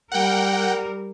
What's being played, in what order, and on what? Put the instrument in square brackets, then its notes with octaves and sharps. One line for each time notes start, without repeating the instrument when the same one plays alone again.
[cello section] G3 A#4 [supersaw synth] F#5 G5